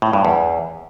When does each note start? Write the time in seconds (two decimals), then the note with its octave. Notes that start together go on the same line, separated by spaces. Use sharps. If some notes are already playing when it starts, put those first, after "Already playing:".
0.02 A2
0.13 G2
0.25 E2